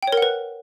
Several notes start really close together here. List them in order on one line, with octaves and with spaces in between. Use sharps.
G5 C#5 A#4 F#5 B4